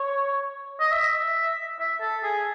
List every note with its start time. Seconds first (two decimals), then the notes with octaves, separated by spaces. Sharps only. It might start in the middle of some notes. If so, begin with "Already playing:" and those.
Already playing: C#5
0.80 D#5
0.92 E5
1.79 E5
2.01 A4
2.23 G#4